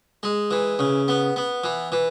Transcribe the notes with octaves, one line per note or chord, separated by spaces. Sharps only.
G#3
E3
C#3
B3
B3
E3
E3